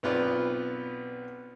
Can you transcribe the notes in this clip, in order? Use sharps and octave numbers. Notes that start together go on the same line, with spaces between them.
B1 B3 C4 F4 B4 D5